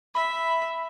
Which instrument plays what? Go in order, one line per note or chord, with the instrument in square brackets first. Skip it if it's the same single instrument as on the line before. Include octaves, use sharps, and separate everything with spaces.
[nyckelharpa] E5 [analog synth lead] B5